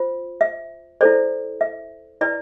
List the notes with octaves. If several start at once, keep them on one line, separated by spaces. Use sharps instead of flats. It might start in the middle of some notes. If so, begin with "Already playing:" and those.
Already playing: F4 C5
E5
E4 A4 C5 D5
E5
E4 B4 D5